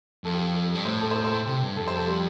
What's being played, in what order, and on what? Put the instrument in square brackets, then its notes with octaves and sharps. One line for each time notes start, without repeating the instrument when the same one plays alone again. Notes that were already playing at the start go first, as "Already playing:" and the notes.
[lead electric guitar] F2 [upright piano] A4
[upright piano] G4
A4
[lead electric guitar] G2
[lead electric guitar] A2 [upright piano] C5
[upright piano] A4
C5
A4
C5
A4
[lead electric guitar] C3 [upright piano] G4
[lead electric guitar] G2
[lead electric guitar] F2 [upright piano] A4
[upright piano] C5
A4
G3